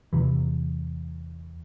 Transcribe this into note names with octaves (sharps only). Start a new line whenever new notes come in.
E2 C3 E3